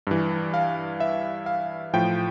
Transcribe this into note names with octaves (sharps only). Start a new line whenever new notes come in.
G2 E3
F5
E5
F5
A2 F3 G5